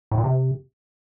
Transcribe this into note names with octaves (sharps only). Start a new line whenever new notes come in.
A2
A#2
C3